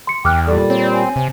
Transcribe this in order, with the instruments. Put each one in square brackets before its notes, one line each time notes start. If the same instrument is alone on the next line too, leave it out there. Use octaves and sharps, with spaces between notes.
[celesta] C6 C#7
[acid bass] E2 [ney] G5 [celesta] D6 F6 F#6
[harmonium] A#2 G3 [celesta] A4 [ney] D5
[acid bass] C4 [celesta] C#5
[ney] G#5
[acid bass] C3